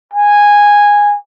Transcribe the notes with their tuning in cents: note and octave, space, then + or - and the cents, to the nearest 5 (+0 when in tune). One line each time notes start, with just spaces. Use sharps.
G#5 -10